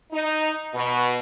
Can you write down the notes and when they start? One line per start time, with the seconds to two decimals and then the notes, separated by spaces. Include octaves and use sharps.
0.12 D#4
0.74 B2